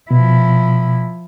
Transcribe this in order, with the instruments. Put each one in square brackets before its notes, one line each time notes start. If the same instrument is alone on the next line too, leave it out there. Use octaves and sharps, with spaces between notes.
[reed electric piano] B2 [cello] F3 E4